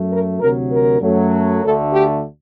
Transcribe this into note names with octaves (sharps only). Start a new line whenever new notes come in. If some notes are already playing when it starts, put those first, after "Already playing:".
Already playing: F#2 F#3 A3
A#4
D2 C3 F#3 A#4
A#4
F#2 F#3 A3
D2 D3 A3 A4
G4